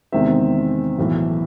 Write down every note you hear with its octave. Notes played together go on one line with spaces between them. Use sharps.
E2 C3 D#3 G#3 C4 E5
B1 A2 E3